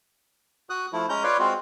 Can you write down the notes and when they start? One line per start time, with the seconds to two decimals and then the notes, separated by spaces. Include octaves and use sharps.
0.70 F#4 D#6 F#6
0.93 F3 A3 E4
1.09 G#3 C#4 A#5 G6
1.24 F4 B4 C#5 D5 C6
1.39 G#3 C4 F4 F#4